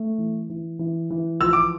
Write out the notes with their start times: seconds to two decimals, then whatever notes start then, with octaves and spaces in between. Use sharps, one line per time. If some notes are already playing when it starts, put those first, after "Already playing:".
Already playing: A3
0.18 E3
0.49 E3
0.79 E3
1.10 E3
1.40 F3 E6
1.53 D6